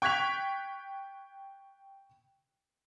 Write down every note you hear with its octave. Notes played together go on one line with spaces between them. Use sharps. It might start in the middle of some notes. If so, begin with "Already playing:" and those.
G5 C#6 F#6 G#6 B6 F7